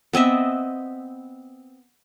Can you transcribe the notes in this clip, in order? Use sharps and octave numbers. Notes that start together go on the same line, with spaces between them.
B3 C4 D#5 E5